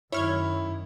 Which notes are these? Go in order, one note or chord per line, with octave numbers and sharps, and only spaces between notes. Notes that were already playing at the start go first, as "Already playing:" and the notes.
F#2 D#3 E4 C#5 F6 G#6